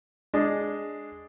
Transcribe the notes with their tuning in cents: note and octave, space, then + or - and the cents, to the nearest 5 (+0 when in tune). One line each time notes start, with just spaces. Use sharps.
G#3 +0 D4 +0